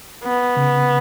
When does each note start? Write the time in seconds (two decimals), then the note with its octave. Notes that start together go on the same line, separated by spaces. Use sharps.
0.24 B3
0.56 C#3